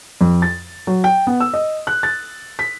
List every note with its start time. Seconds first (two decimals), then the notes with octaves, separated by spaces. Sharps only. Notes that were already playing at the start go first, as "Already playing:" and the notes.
0.21 F2
0.42 A6
0.87 F#3
1.04 G5
1.27 B3
1.40 E6
1.53 D#5
1.87 F#6
2.03 A6
2.59 B6